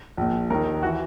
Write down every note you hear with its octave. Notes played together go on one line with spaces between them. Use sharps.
A#1 A#2
D#2 D#3 A#4
E3 F#4